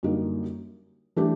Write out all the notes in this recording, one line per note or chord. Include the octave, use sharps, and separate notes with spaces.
F#2 D3 G3 A#3 D#4
E3 A3 D4 G4